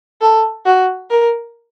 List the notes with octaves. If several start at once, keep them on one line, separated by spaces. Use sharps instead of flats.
A4
F#4
A#4